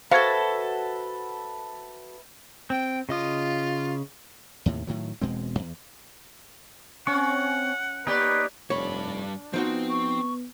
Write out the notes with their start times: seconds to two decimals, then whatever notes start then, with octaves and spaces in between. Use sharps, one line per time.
0.11 F#4 A4 B4 C5 E5 F5 A5 G#6
2.70 C4 G5
3.09 C#3 F4 D#5 D#6
4.66 D#2 A2 C3
4.87 A2 D#3 F#3
5.21 E1 B2 G#3 C4
5.59 E2
7.07 C4 C#4 F#5 C#6
8.07 A#3 D#4 G4 B4 C#5 D5
8.70 F1 G2 D4 C#5 B5
9.54 F3 B3 C4 D#4 F#4 C5
9.90 C#6